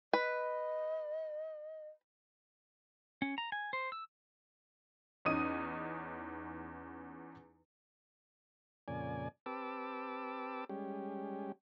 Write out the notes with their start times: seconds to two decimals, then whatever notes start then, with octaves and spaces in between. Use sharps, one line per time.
0.13 B4 D#5
3.22 C#4
3.38 A#5
3.52 G#5
3.73 C5
3.92 E6
5.25 E2 C#4 D#4 D#6 D#7
8.88 F2 A#2 C#3 D5 G#5
9.46 C4 G4 B4 A5 D6 E6
10.69 G3 G#3 C#4 G4